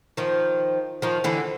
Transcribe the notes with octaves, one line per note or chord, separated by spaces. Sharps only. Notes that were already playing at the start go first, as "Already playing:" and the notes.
D#3 F3
D#3 F3
D3 E3